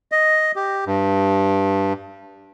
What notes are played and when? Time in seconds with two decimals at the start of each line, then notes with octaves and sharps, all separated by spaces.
0.12 D#5
0.56 G4
0.86 G2